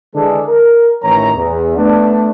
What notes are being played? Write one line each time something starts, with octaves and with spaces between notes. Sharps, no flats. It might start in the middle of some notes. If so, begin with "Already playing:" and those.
D3 E3 G#3 D4 G#4 A4
A#4
A1 D#3 E3 C#5 A#5
E2
A3 B3 D4